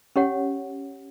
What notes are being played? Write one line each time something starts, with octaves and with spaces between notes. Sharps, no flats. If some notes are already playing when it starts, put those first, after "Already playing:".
C#4 G4 C#5 F#5